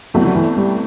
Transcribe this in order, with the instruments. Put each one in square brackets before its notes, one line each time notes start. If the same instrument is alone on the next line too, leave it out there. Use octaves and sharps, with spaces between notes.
[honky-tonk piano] C2 B2 A3 C4 E4 [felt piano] F#3
[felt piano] F#3
E3
G3